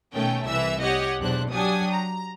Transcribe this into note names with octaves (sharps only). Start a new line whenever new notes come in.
B2 D#3 A3 C#4 G5
C2 E3 E5 E6
G4 C#5 D#5 F#5
B1 E2 D4 C5 F#6
F#3 D4 G4 G#5 D#6
A#5